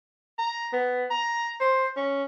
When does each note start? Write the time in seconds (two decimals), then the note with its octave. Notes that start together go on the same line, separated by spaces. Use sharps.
0.39 A#5
0.73 B3
1.11 A#5
1.61 C5
1.97 C#4